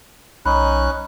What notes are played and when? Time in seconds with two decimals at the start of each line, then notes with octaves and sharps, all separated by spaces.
0.46 B1 C#4 D#4 B5 F#6